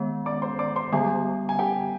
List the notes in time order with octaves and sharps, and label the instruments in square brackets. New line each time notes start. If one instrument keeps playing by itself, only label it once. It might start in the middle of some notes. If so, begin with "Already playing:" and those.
Already playing: [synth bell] D#3 G#3 B3
[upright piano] D5 D6
C5 C6
D5 D6
C5 C6
[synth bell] D3 G3 B3 [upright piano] G#4 G#5
[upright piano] G#5
G4 G5